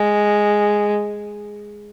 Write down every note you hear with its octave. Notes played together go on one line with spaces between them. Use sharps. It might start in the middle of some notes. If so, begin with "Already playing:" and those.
Already playing: G#3